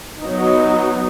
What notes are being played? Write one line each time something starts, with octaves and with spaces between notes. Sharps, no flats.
F#3 B3 D#4